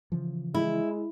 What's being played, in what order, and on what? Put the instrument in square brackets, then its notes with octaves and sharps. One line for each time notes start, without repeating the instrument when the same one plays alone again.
[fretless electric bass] C#3 E3 F3
[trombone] G#3 [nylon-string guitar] E4